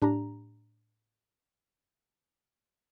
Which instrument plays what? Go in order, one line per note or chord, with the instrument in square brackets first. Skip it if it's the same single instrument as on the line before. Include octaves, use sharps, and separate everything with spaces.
[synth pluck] A2 D4 G4 A#5